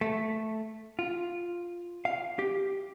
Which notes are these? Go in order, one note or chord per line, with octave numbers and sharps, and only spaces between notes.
A3
F4
F5
G4